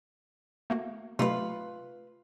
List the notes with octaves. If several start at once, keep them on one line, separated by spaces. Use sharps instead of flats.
A3 A#3 F#4
C3 F#3 A3 F4 B4